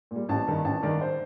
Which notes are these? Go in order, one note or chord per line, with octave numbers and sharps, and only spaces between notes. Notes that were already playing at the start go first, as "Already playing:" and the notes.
A#2 G3
A1 A5
G2 D#3
A1 A5
G2 D#3 D5
C5